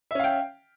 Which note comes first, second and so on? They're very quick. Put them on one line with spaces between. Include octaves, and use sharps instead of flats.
E5 C#4 F5 G5